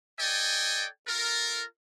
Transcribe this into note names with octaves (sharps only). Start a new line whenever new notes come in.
A4 D5 D#5 G5 G#5
F4 A4 A#4